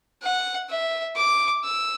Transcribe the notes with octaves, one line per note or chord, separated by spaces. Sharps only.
F#5
E5
D6
E6